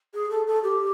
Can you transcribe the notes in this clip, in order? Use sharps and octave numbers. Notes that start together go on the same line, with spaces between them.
G#4
A4
A4
G4